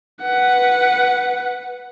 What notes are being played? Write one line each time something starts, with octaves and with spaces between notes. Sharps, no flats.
B4 F#5